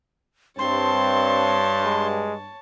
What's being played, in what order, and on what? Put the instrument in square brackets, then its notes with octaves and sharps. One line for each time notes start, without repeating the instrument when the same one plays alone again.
[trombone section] G2 [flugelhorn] C4 [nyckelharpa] C#5 A5 [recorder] C6
[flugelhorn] G#3